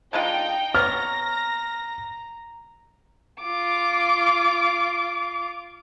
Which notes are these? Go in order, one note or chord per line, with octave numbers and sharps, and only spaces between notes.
D3 G#3 D#4 F4 G5
B3 C#5 A#5 F6 A#6
F4 D6